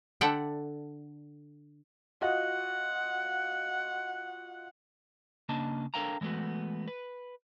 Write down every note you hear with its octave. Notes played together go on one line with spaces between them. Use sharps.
D3 A4 D5 E5 F#5 G5
F4 F#4 D#5 F#5
C#3 A#3 D4 D#5 A5
D4 A4 A#4 F5 G5 A#5
E3 G#3 A3 B3 F#4
B4